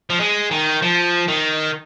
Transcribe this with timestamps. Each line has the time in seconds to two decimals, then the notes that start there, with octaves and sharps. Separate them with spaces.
0.10 F3
0.20 G#3
0.51 D#3
0.82 F3
1.28 D#3